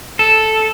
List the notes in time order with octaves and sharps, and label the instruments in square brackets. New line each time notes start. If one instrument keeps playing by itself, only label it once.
[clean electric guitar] A4